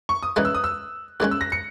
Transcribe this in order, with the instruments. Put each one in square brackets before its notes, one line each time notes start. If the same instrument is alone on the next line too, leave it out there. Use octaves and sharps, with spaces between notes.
[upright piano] C#6
D#6
[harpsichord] C#3 E3 G#3 D#4 [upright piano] F#6
[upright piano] E6
D#6
E6
[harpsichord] D#2 C#3 G#3 C#4 [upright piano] F#6
[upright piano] E6
A#6
C#7